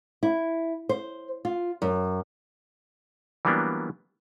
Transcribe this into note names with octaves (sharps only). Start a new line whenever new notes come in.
E4
C5
F4
F#2
E3 F#3 G3 A#3 B3 D4